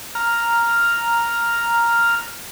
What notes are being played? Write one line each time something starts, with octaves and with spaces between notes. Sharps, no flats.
A#5 F6